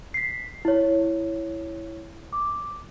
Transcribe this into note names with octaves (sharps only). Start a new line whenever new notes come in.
B6 C7
E4 C#5
D6